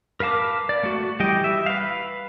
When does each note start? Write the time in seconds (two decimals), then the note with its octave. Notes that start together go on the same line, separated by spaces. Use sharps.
0.20 A#4 B4 F5 A5 D6
0.69 D5
0.83 A3 F#4
1.20 E3 G3 G4 D#5 G5
1.44 E5
1.66 B4 F5